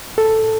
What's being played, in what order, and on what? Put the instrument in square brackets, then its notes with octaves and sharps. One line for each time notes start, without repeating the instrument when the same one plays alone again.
[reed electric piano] A4